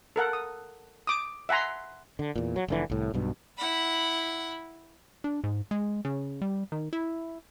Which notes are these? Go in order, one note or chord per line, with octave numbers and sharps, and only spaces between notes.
A4 A#4 F#5
D#6
D6 D#6
E5 F#5 G#5 A#5 C6
D3
E2 A#2
F#3
F1 D3 E3
C2 A2
B1 G2 B2
E4 F#5 B5
D4
G#2
G#3
C#3
G3
D#3
E4